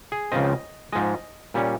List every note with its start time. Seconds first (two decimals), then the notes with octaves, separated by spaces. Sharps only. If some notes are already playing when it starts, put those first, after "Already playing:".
0.12 G#4
0.32 C#2 C#3 F3 C4 D#5
0.92 G#2 F3 G#3 D#5
1.54 A#2 G3 C#4